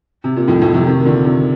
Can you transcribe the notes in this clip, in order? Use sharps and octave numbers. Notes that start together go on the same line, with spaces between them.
C3
A#2
F2 A2
F2 A2
A2 C3
C3 D#3
D#3
A#2 D3
C3 D#3